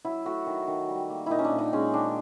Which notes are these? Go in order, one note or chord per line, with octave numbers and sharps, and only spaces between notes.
F#3 E4
A3 F#4
D#3
D#3
G3
A#3
A#2 D#4 E4
C#4
D4
A#2
D#4
G#3 C#4
D#3 D4